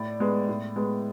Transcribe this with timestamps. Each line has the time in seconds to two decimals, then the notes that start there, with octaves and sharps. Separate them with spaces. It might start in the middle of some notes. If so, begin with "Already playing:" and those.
Already playing: A2 D5
0.20 G#3 B3
0.48 A2
0.76 G#3 B3